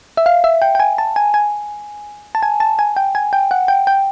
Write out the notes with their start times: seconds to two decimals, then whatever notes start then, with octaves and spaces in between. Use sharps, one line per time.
0.17 E5
0.26 F5
0.44 E5
0.62 G5
0.75 G5
0.80 G#5
0.98 A5
1.16 G#5
1.34 G#5
2.35 A5
2.43 G#5
2.60 A5
2.79 G#5
2.96 G5
3.15 G#5
3.33 G5
3.51 F#5
3.68 G5
3.87 G5